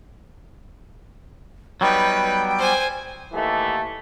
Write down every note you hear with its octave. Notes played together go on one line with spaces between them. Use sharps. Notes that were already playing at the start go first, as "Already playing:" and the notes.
F#3 G3 B3 D#4 B4 G5
C5 G#5
D#2 E3 A3